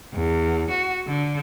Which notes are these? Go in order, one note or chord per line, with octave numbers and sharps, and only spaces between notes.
E2
F#4
D3